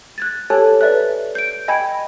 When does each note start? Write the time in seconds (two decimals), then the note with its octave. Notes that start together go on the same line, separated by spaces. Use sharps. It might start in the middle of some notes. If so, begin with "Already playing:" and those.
0.18 F#6 G#6 A6
0.50 G4 A4 C#5 G#5 A5 F#6
0.81 B4 D5 E5 F#6
1.35 G6 D7
1.68 D#5 G5 G#5 B5 G#6